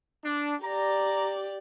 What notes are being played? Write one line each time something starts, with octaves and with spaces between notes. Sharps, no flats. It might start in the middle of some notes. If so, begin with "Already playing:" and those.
D4
G4 D5 A#5